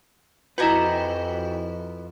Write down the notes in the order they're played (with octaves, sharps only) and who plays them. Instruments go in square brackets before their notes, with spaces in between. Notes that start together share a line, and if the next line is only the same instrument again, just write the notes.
[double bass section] F2 [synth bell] E4 F#4 [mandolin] G4 G#5 A#5 [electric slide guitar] B4 D#5